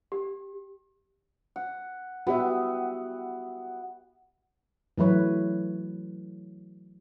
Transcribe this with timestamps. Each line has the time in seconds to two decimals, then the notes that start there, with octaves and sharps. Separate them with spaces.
0.12 G4
1.56 F#5
2.27 B3 F#4 G4 E5
4.98 E3 F#3 A3 B4 C#5